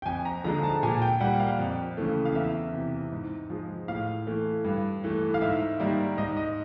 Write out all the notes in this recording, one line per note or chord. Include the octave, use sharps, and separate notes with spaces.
G5
F2 G#5
A#5
D3 F3 G#3 A#5
A5
A#2 G#5
G5
G3 A#3 F#5
F5
F2
C#3 E3 A3
F5
E2 E5
C3 E3
G#2
F3 G#3
A2 F5
E3 A3
G2
E3 A3
F5
G#2 E5
D#3 G3 A#3
G#2 D#5
D#5